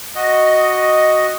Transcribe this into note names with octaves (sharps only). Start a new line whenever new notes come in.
F#4 D#5